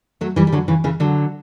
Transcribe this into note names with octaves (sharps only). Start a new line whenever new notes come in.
F#3 A3
E3 G3
G3
D3 F#3
C#3 E3
C#3 E3
D3 F#3